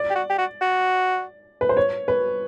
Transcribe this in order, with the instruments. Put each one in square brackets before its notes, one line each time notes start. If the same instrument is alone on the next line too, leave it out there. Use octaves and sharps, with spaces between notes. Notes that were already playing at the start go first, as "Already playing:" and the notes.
Already playing: [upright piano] D5
[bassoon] G4
F#4
G4
F#4
F#4
[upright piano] B4
C5
C#5
B4